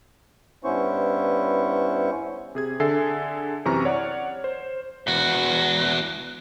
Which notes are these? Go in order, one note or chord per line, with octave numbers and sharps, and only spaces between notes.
G2 B3 C#4 E4 C5 C#6
C3 G#4 G#6
D3 G#4 A4 E5 G#5 C7
F#2 C3 E3 A#5 C#6 F6
C#5 D5 F#5
C5
E2 F#4